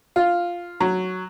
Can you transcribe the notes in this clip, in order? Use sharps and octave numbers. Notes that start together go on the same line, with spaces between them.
F4
F#3